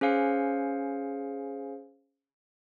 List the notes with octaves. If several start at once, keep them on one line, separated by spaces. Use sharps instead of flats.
C#4 G#4 C5 F5 G#5 C#7